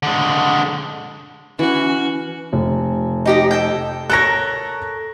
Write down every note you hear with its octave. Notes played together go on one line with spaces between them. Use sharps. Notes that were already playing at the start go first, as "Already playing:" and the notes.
D3 G#3
E3 C#4 F#4 F#5
F1
D#4 G4 D#5
A4 G5
A4 A#4 C#5 F#6 A#6